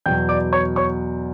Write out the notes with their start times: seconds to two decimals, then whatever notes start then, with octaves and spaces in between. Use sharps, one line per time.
0.06 E2 B2 F#3 G5 G6
0.29 D5 D6
0.53 C#5 C#6
0.76 C#5 C#6